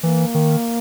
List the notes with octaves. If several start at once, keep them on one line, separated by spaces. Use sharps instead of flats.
E3 A#3
D#3